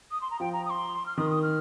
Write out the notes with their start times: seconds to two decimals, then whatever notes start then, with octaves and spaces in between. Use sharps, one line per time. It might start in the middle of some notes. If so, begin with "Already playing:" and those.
0.11 D#6
0.21 C6
0.31 A#5
0.40 F3 G5
0.53 A#5
0.65 D#6
0.70 C6
1.06 F6
1.17 D#3 D#6
1.30 D#6
1.43 F6